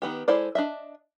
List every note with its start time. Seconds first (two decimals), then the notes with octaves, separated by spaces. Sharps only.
0.02 D#3 B3 G4
0.28 G#3 E4 A4 C5 D5
0.55 D4 D#5 E5